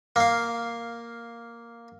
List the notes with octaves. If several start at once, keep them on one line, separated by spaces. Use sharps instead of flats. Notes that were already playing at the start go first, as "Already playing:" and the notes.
A#3 F5